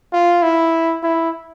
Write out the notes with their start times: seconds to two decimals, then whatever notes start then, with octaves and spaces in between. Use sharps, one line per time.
0.13 F4
0.43 E4
1.03 E4